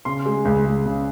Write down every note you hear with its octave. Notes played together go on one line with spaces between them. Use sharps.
C#3 C6
G#3
C#2
C#2
C#3